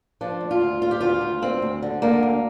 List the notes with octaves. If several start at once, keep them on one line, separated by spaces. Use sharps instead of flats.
F3 D4
D2
F4
D2
D2 F4
G4
D2 F4
D2
D2 C4
D2
D3
D3 A#3
D2